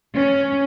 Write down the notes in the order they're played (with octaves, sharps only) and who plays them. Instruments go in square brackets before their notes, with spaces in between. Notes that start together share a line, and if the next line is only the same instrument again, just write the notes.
[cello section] C#4